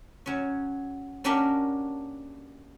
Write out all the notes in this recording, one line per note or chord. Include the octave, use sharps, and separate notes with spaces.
F#3 C#4
A#3 C#4 D4 F#4 G4 A#4